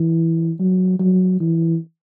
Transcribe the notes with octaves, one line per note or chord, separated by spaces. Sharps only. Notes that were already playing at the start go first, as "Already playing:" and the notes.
Already playing: E3
F#3
F#3
E3